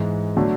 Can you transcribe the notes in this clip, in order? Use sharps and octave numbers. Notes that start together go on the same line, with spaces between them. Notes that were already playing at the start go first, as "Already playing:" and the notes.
Already playing: G#2 E3 G#3
D3 F#3 A3